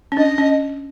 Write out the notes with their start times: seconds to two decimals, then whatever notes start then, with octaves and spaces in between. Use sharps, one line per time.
0.12 C#4
0.17 D4 D#5
0.38 C#4